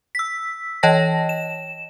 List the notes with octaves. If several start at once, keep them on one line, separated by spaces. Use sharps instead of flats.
E6 B6
E3 C#5 D#5 G5 A5 A#6
E7